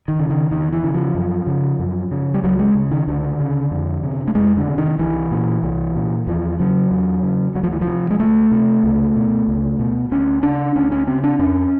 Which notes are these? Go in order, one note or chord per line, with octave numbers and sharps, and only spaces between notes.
D#3
C#3
D#3
E2 D#3
E3
C#3
F3
F#2
C#3
F#2
C#3
G3
C#2 F#3
G#3
C#3
D#3
C#2 D3
C#3
F2
C3
A3
F2 G#3
D3
C3
D#3
C2 E3
A#2
C2
A#2
E2 F3
C#3 F#3
E2
C#3
D2 F#3
F3
E3
F3
C3
G#3
D2 A3
C3
C#2
B2
C#2
B2
D2 C#4
C#3 D4
D2 C#4
C#4
C#3 C4
D4
F2 C#4